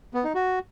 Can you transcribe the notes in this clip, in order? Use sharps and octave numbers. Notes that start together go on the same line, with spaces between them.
B3
D#4
F#4